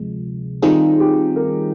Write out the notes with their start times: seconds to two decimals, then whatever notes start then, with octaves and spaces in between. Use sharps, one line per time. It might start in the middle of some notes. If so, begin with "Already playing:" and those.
Already playing: D2 C3 F3 G#3
0.62 D#3 G3 C4 D#4 F4 G#4
1.00 G4
1.36 A#4